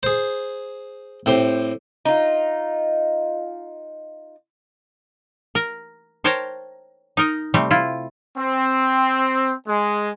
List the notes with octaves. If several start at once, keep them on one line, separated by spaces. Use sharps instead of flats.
G#4 C5
A2 C4 G4 C6
D#4 F4
A#4
A#4 C5 C#5 G5 A5 A#5
D#4 A#4 D#5
C3 G3 A3 C4
E4 F4
C4
G#3